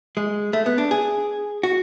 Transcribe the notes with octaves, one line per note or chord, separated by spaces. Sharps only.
G#3
A3
B3
D4
G#4
F#4